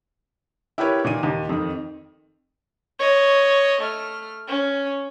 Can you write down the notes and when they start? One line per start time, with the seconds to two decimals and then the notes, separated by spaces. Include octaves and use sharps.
0.78 E4 G4 A#4 B4 C#5
1.04 A#2 D#3 D#7
1.23 D#2
1.49 F2 D#3
2.99 C#5 D#5
3.81 A3 F6
4.48 C#4